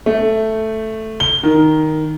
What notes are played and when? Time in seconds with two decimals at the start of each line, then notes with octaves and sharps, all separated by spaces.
0.06 A3
1.20 G7
1.43 D#3